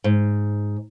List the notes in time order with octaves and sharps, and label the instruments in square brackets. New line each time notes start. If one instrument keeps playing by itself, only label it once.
[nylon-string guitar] G#2